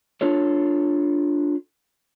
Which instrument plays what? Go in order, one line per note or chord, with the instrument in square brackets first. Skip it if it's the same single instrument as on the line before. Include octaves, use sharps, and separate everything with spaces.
[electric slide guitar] D4 F4 A4 C#5